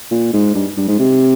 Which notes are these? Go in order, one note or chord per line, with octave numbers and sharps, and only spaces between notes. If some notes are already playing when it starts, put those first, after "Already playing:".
A#2
G#2
G2
G2
G#2
C3